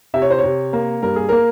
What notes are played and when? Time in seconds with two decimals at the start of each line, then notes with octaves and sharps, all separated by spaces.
0.14 C3 E5
0.22 C#5
0.30 C5
0.38 C#5
0.43 C3
0.73 A#3
1.03 G2 A#4
1.16 G#4
1.29 A#3 A#4